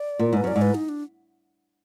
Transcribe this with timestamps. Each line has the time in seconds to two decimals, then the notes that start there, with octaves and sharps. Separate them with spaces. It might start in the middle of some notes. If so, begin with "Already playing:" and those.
Already playing: D5
0.19 A#2
0.33 G#2 B4
0.44 F#2 D5
0.56 G#2
0.62 B4
0.75 D#4
0.89 D4